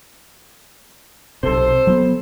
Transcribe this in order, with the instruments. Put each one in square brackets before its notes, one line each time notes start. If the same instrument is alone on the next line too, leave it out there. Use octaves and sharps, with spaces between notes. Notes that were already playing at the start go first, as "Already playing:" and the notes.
[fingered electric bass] B1 C3 [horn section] A4 C5
[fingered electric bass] F#3 B3